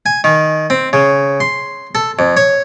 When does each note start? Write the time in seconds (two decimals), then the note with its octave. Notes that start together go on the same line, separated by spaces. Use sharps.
0.06 G#5
0.24 D#3
0.70 C4
0.93 C#3
1.40 C6
1.95 A4
2.19 F2
2.37 C#5